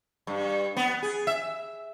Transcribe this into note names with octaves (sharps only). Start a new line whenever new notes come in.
G2
B3
G#4
E5